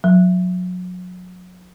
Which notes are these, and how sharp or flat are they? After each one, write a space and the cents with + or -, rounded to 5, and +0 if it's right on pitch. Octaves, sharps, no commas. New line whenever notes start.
F#3 -30